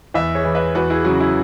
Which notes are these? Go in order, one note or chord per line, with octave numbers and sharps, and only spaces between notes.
E2 B4 E5
G#4 C#5
E3
B4 E5
E2 F#4 B4
E4 G#4
C#3 F#3 F#4
E4